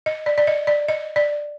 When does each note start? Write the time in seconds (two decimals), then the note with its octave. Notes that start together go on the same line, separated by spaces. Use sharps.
0.06 D#5
0.26 D5
0.38 D5
0.47 D#5
0.67 D5
0.88 D#5
1.16 D5